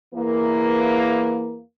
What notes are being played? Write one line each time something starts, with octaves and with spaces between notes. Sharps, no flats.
E2 E3 A#3